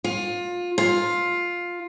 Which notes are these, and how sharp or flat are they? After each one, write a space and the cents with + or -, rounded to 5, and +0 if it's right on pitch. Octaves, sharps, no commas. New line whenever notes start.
F4 +20
F4 +10